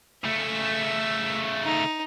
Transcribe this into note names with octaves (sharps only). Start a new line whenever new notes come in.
C#3 A3 E5
D#4